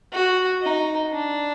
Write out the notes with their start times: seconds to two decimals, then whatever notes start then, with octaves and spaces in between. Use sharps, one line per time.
0.13 F#4
0.62 D#4
1.12 D4